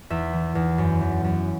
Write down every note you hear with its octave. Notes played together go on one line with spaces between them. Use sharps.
E2 E5
E3
E2
F#2
E3
F#2